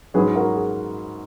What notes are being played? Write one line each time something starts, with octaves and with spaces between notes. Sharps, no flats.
G#2 F#3 C#4 G#4 B4
F#4 A#4
G#4